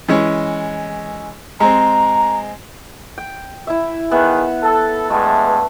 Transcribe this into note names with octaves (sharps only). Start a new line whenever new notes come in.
E3 G#3 C#4
G#3 C4 A#5
G5
E4 E5
D#3 E3 B3 G#4 E5 F#5
A4
G2 G#3 A3 B3 A4